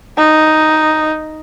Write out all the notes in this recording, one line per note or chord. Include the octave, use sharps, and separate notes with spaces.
D#4